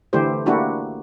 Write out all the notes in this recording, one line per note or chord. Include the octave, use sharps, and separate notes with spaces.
D3 E3 A3 E4 G4 C5
A3 A#3 D4 E4 F#4 G4